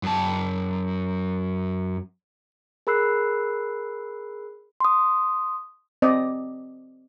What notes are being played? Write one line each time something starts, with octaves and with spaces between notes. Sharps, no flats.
F#2 A5
G#4 A#4 B5 E6 F#6 C7
C6 D#6
C4 D5 D#5